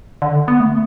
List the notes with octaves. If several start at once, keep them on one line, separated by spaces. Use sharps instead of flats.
D3
B3
A3